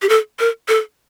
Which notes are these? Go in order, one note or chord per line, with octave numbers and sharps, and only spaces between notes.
G4
A4
A#4
A4